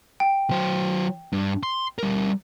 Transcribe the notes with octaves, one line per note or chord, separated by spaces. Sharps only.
G5
F#3 C5
G2
C6
G3 A#4